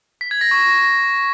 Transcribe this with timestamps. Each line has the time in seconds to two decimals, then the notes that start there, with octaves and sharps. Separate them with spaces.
0.21 B6
0.31 G#6
0.41 A#6
0.51 C#6